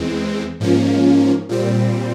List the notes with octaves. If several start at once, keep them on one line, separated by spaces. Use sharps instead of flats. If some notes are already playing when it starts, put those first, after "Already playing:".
Already playing: E2 E3 G#3 C4
G#2 F3 A#3 C#4
A#2 G3 C4